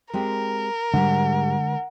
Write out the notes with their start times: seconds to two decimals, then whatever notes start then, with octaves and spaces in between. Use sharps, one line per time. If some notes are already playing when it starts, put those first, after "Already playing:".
0.13 G#3 C4 G4 A#4
0.94 G#2 D3 G3 G#3 D4 F#5